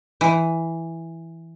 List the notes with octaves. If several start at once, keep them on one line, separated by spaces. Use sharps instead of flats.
E3